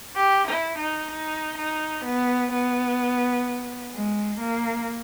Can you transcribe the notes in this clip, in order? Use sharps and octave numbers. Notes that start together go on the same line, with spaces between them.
G4
E4
D#4
D#4
D#4
B3
B3
G#3
A#3